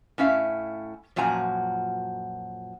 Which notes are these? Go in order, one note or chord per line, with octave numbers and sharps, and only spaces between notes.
A2 C#4 E5 F5
F#2 A#2 F3 F#4 G#5 A#5